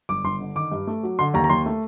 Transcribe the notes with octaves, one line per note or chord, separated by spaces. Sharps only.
G1 D6
G1 C6
D3
D#3 D6
G2
A3
F#3
D3 C6
D#2 A#5
A#5
D#2 C6
A3